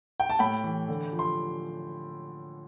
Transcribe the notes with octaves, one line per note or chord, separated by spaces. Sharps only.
G5
A5
A2 G5 B5
E3
D3
F3
C6